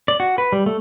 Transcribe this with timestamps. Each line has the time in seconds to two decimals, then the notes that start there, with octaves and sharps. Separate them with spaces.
0.08 D5
0.20 F#4
0.38 B4
0.52 G3
0.66 A3